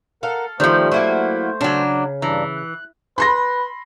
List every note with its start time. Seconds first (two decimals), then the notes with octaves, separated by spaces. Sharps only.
0.23 A4 A#4 F5 F#5
0.60 D#3 F3 G3 A3 C5
0.92 F#3 A#3 E4 F#4
1.61 C#3 F#3 D4
2.22 G2 E3 D4 A#5
2.56 F#6
3.18 B4 B5 C6 A#6